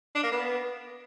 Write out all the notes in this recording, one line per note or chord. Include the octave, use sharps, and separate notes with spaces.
D4
A#3
B3